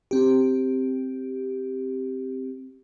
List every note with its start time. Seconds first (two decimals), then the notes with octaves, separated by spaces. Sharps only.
0.11 C4 G4